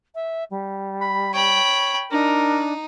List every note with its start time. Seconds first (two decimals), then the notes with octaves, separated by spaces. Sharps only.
0.15 E5
0.50 G3
1.01 B5
1.34 C#5 G5 B5
2.11 D4 D#4 A#4